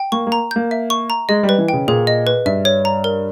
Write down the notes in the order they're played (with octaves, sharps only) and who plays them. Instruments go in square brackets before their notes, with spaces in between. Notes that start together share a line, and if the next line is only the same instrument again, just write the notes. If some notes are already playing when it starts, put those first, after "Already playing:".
Already playing: [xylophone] G5
[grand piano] A#3 [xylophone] C#6
[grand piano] A#3
[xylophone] A#5
[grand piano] A#3 [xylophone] G6
[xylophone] E5
C#6
A#5
[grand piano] G#3 [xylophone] D#5
[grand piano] G3
[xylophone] B4
[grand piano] E3
[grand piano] C#3 [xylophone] G5
[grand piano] A#2 [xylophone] G#4
[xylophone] D#5
B4
[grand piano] G2 [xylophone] E5
[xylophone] C#5
A#5
A#4